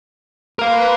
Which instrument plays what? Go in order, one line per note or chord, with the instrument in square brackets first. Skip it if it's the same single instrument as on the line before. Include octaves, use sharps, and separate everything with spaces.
[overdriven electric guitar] A#4 F5 [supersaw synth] B4 C6